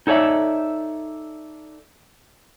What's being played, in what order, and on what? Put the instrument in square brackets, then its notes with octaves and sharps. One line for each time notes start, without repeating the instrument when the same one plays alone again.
[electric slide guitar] D#4 A4 C#5 D5 E5